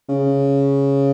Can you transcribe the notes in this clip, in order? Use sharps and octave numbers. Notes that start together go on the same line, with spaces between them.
C#3